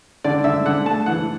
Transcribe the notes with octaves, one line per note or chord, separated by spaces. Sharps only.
D3 D5
D3 E5
D3 F#5
A3 A5
E3 F#5